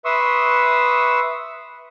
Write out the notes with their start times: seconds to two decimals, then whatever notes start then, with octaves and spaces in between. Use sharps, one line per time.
0.05 B4 E5 C6 C#6 D#6 E6